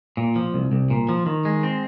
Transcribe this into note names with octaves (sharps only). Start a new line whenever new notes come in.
A#2
F3
C2
C2
A#2
F3
D#3
G#3
C4